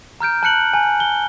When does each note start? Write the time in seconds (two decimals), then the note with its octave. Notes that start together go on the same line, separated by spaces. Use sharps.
0.20 A#5 F6 G6 D7
0.43 A5 F#6 C#7 F#7
0.74 G#5
1.00 G7